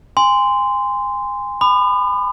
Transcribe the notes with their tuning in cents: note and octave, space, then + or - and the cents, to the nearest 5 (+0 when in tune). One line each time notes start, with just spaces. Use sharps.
G#5 -30 C6 -15
B5 +25 D#6 -45